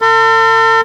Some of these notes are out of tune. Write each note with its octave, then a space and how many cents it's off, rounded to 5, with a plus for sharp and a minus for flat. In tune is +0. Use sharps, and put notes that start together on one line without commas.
A4 +45 C6 -40